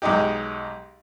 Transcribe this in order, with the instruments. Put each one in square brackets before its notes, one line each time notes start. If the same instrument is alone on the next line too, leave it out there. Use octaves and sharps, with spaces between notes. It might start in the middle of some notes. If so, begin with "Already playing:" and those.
[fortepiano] B1 G#3 D#4 G4